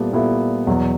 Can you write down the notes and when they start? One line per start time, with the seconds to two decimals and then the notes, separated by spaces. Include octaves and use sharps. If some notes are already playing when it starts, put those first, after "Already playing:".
Already playing: A#2 G3 B3 E4 A4
0.13 A#2 G3 B3 E4 A4
0.67 E2 B2 F#3